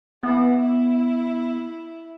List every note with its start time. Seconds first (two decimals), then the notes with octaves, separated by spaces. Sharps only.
0.23 E3 B3
0.61 E4